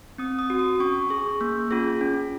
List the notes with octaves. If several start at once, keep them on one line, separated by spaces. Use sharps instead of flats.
C4 D#6
D#6
F#4
D#6
C#4 C#6
G#4
A#3
C#4 F4 G#4
C#4